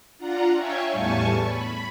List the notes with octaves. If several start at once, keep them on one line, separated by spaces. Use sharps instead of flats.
D4 F4 F#5 A#5
C#5 E5 F5 G5 G#5 C#6
E2 A2 G3 G#5 A5 C#6
B5